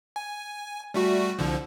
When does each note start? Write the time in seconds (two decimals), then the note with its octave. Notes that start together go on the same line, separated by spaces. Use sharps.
0.16 G#5
0.94 G3 A3 F#4
1.39 C2 D3 F3